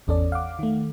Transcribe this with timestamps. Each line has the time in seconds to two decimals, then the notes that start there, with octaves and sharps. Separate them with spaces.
0.07 G#1 E2 C#4 A4 D5
0.32 F5 F#5 D6
0.59 D#3 A3